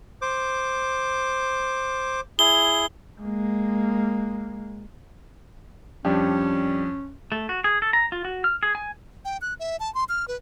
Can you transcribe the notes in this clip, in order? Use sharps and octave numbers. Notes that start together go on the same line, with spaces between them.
C5 D6
E4 G#4 G7
G#3 A#3
F2 G3 C#4 D4 G4
A3
F#4
G#4
A4
A#5
F4
F#4
F6
G#4
G#5
G5
F#6
E5
A5
C6
F6
B4